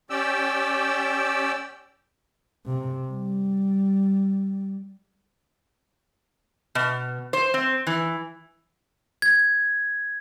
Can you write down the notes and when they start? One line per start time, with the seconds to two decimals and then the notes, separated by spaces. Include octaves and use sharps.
0.10 C#4 G4 D5 G5 E6
2.66 C3
3.08 G3
6.75 B2
7.33 C5
7.54 C4
7.87 E3
9.22 G#6